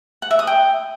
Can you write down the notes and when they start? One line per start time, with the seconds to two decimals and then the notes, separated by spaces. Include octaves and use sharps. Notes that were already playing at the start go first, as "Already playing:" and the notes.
0.22 F#5
0.31 E5
0.39 D#6
0.47 G5